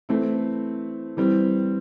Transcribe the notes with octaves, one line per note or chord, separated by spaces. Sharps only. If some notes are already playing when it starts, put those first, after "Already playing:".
E3 A3 C4 E4
E3 G3 C4